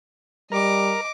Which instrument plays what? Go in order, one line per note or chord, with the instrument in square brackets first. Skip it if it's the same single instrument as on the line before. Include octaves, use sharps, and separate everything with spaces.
[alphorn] G3 [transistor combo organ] A#4 A#5 [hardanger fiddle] D#5 D6